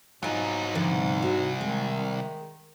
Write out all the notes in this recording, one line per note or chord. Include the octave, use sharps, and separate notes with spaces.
G#2 F#3 D#4 F4 G#4
C2 B2 D3 F3
F#4
D#3 G#3